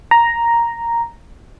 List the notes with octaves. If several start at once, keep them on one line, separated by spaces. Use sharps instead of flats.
A#5